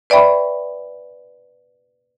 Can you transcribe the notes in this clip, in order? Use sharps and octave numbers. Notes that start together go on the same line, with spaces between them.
B4 D5 E5 G5 B5 C#6